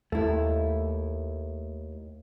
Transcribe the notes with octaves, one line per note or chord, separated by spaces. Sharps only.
D#2 A3 E4